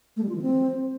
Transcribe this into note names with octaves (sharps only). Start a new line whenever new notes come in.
A3
G3
F4
E3
C4